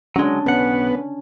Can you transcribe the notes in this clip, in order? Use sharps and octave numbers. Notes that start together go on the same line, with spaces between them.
F#3 G#3 C#4 D4
B1 B3 C#4 F#5